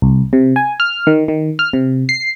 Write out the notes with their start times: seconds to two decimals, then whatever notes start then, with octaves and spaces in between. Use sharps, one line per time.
0.02 C2
0.33 C3
0.56 G#5
0.80 F6
1.07 D#3
1.28 D#3
1.59 F6
1.73 C3
2.09 C7